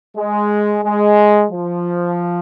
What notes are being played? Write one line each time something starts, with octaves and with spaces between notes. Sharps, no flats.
G#3
G#3
F3